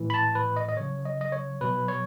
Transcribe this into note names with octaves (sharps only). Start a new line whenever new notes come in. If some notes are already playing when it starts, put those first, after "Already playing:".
Already playing: A2 E3
B5
A5
B4
D#5
D#5
C#3 F#3 C#5
D#5
D#5
C#5
B2 F#3 B4
C#5